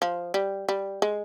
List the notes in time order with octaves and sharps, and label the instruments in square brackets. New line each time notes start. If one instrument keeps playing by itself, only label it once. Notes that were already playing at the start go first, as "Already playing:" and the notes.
[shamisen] F3
G3
G3
G#3